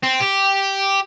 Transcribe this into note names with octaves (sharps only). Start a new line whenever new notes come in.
C4
G4